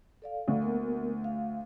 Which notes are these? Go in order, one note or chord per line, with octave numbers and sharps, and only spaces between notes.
A4 D5 F5
D2
A#3 B3 A#4
F5